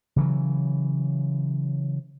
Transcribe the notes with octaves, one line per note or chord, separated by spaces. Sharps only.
C#3 E3 F#3